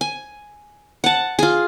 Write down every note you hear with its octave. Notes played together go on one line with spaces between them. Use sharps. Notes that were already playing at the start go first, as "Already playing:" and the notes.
G#5
F#5 A5
F4 G#4